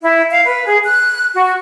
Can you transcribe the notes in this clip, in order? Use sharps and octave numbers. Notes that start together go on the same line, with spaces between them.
E4
F5
B4
G#4
F#6
F#4